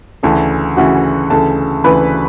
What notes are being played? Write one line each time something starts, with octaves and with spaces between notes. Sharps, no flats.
D2 C#3 E3 A4 A5
D2 C#3 E3 F#4 F#5
D2 C#3 E3 A4 A5
D2 C#3 E3 B4 B5